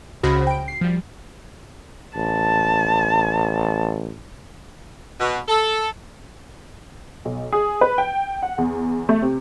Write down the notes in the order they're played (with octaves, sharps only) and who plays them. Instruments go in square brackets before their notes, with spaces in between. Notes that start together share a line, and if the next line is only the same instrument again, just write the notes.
[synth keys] C#2 C#3 F#4 C5 B5 A#6
G5 D7
C7
F3 G3
[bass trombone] A1 [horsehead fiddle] A5
[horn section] B2
A4
[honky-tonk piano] B1
G#4
B4
G5
F#5
E2
A3
C3